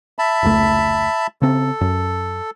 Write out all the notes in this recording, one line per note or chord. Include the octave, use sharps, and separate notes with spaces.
E5 A5 B5
F1 C#2 A3
C#3 C4 A4
F#2